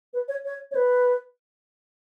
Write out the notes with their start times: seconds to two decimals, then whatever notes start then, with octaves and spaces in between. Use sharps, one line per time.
0.14 B4
0.28 C#5
0.45 C#5
0.71 C#5
0.75 B4